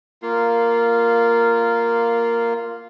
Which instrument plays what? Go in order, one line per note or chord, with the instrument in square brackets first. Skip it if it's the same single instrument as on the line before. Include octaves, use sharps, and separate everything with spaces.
[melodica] A#3 F4